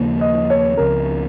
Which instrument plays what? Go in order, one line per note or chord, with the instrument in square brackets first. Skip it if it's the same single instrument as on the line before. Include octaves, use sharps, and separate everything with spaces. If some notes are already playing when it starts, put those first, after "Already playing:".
Already playing: [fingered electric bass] D#2 C#3 F3 A#3
[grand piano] D#5
C#5
[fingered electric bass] C#2 C#3 F3 C4 [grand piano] A#4